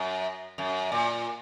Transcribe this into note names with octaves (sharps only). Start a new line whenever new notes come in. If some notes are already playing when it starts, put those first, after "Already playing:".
Already playing: F#2
F#2
A#2